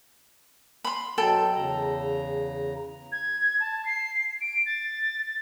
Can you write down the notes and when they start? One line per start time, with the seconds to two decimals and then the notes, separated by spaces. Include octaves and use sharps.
0.84 B5 C6
1.18 B2 F#3 A4 G5
1.55 E2 C#3 A#5
3.12 G#6
3.60 A5
3.85 C7
4.41 D7
4.66 A6